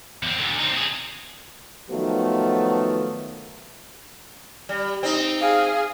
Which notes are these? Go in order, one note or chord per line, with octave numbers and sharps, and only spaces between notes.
E2 C4
D2 D3
C4 D#4
C3 G#4
D#3 F3 F#3 A3 B3 F#4
G3
C4 D#4
G#4 F5